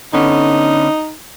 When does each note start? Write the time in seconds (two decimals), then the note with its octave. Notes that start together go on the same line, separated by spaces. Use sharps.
0.13 D3 B3 C#4 D#4